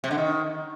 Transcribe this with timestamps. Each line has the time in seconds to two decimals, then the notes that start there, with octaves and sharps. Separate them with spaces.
0.04 C3
0.11 D3
0.18 D#3